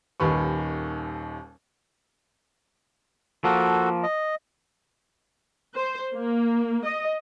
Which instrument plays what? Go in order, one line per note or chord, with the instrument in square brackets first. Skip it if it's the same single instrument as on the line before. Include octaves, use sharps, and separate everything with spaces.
[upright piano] D#1 D#2 D#3 B4 C#6
[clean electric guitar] F3 A#3 [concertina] F#4 A4
[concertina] D#5
[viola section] C5
A#3
D#5